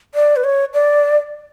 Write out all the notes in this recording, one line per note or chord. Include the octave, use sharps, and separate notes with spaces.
D5
B4
C#5
D5